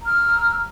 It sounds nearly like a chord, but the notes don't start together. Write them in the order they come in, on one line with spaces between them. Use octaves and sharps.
A#5 F6 E6